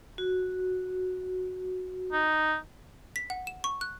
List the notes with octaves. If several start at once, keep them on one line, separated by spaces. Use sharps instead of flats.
F#4
D#4
B6
F#5
E7
C#6
F#6